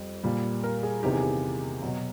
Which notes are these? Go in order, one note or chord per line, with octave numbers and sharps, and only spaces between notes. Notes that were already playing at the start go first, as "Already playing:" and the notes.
Already playing: F2 G3
A#2 G3
A#4
G#4
E2 C3 D#3 G4
G#4
G4
B2 F#3 F#4